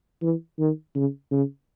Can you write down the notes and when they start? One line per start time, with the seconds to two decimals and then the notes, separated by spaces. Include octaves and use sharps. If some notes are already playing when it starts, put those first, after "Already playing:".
0.22 E3
0.59 D#3
0.96 C#3
1.31 C#3